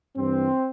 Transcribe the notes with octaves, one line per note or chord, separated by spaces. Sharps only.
G2 E3 C4